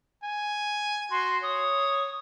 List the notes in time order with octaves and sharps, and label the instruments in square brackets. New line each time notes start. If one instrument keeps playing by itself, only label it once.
[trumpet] G#5
[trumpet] F#4 [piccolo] C6
[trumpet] C#5 [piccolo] D#6